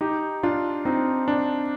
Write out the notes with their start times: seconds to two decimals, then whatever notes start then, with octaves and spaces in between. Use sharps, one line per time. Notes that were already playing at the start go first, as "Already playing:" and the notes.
0.01 D#4 G4
0.43 D4 F4
0.85 C4 D#4
1.28 D4